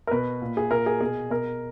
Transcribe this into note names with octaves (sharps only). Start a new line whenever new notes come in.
A#4
B2 B4
A#2
G#4
A#2 A#4
G#4
B2 G#4
B2 A#4